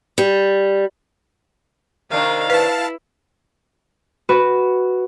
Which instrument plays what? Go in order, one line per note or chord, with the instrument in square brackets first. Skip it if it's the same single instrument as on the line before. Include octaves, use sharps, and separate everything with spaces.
[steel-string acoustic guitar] G3
[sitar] C3 D#3 D4 [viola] A#4 F5
[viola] E4 [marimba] B4 [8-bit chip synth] F5 A5
[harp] F#4 B4